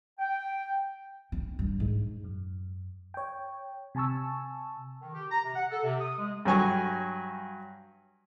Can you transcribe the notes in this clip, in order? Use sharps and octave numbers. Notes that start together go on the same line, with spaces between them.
G5
C#4
G2
G#2
F#2
C#5 G5
C3 G#5 A5 C#6 E6
D#3
G4
A#5
C3
F#5
A4
C3
D#6
G#3
G2 F#3 G#5 C#6